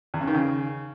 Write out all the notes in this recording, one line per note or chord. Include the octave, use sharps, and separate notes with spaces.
E2
C#3
D#3
C#3